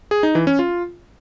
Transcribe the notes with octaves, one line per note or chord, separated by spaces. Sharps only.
G#4
D#4
E3
C#4
F4